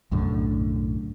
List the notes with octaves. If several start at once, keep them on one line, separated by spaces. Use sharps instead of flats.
B1 F#2 A2 D3